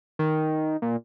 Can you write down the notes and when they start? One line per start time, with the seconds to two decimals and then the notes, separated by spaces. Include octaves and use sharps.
0.19 D#3
0.82 A#2